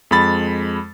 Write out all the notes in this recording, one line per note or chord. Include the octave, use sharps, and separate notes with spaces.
F2 G#3 B5 A6